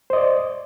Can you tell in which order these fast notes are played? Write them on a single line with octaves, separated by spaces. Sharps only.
C5 D#5 D5